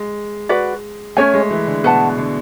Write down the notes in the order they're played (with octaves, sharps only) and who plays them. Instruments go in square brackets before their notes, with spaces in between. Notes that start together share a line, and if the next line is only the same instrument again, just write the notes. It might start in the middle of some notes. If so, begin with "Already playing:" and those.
Already playing: [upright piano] G#3
[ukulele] F#4 B4 D5
[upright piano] A3 [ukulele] C#4 G#4 C#5 G#5
[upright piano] G#3
E3
D3
[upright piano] B2 [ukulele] B4 F#5 A5
[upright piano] D3